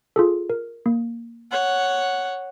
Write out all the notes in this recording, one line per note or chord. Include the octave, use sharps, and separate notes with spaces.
F4 G#4 A4
A#4
A#3
C#5 F#5